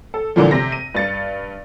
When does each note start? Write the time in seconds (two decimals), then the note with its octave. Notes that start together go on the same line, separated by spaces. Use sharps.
0.14 A4
0.36 A#2 D3 E3 F3
0.51 C3 A#6
0.72 D#7
0.94 G2 A6 C#7